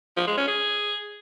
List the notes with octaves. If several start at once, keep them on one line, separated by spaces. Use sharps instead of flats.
F3
G#3
C#4
G#4